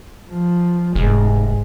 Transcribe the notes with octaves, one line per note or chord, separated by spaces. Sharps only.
F3
F1 G#2 G#3